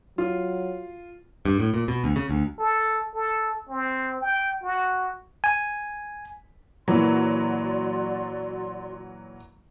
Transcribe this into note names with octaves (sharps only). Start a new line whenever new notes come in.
F#3 F4
G2
A2
A#2
B2
D2
C#3
D2
A4
A4
C4
G5
F#4
G#5
A#2 E3 F#3 F#4 D5 C6